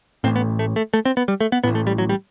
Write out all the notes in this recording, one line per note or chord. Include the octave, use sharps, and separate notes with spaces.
A1 A2 C4
B3
A3
A3
A3
C4
B3
G3
A3
B3
A1 A2 B3
A3
G3
F#3
G3